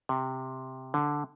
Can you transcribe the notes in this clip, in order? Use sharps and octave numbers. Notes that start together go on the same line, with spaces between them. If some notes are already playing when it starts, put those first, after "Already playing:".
C3
D3